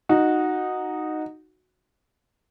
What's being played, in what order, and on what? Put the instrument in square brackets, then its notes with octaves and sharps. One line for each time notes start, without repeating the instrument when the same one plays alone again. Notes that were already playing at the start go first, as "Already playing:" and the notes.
[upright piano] D#4 F#4